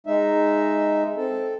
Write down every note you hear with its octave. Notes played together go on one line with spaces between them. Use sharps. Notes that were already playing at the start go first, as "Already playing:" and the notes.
G#3 D#4 E5
C4 A4